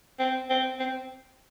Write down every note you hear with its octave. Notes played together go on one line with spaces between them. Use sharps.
C4
C4
C4